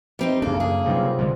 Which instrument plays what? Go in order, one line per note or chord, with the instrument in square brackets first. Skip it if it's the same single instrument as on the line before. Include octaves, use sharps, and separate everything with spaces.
[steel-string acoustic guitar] G3 C4 D#4
[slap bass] F#2 D4 [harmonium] C#3 A#3 [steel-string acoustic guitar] A4
[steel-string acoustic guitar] G#4
[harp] C3 D#4 F4 [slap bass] F#3 G3
[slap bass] D3 G3 G#3